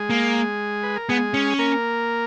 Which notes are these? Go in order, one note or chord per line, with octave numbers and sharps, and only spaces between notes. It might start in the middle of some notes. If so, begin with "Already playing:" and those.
Already playing: G#3 G#4
A#3
B4
A#4
G#3 B3 G#4
C#4
A#3 A#4